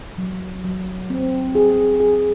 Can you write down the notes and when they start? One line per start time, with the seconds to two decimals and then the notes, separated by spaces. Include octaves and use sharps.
0.18 F#3
0.64 F#3
1.10 C4
1.55 G#4
2.00 G#4